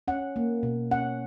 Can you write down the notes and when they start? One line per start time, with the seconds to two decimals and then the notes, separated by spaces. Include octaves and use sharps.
0.08 C#4 F#5
0.36 A#3
0.63 B2
0.91 C#4 F#5